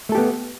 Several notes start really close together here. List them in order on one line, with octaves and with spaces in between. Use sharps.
A3 A4 G4 B3